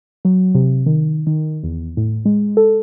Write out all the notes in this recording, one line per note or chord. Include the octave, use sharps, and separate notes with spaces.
F#3
C3
D#3
D#3
E2
A2
G#3
A4